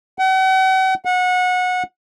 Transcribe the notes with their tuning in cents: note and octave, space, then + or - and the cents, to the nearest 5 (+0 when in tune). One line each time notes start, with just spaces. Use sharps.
F#5 +40
F#5 -25